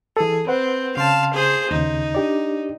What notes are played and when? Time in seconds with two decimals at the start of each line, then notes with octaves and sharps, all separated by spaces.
0.17 E3 G#4 A4
0.47 C4 B4 C5 F#5
0.97 C#3 F5 A5 C6
1.34 G#4 C5
1.71 D#2 C#3 D#4
2.15 D4 G4 D5